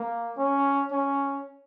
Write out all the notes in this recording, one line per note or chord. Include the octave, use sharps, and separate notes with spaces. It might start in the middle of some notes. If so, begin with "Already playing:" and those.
Already playing: A#3
C#4
C#4